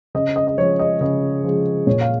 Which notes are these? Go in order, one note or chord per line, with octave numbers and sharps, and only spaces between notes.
C#3 D#5
D#5
D#5
F3 G#3 C#5
D#5
C#3 D#5
F3 G#3
A#2 C#5
F5